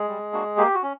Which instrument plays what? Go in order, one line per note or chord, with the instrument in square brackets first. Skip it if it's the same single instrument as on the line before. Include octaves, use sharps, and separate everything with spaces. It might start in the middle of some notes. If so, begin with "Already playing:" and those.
Already playing: [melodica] G#3 G#4
G3
A#3 D4 F#4
A#3 G4
F#4
C#4